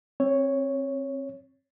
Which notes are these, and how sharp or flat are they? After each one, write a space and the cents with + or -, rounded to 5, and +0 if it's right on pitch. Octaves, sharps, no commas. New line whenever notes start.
C4 +25 C#5 +0